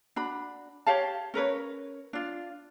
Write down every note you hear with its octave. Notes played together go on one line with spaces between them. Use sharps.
D4 F#4 B5
G4 C#5 F5 A5
C#4 A#4 B4 C#5
D4 F4